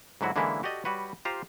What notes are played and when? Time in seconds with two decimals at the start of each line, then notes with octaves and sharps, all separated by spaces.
0.21 G#2 D3 F#3 E4 F#4
0.36 D3 E3 G#3 A#3 C#4 E4
0.63 F#4 G4 A4 D5 D#5
0.85 G3 F#4 B4 C#5
1.25 F4 G4 C5 F5 A#5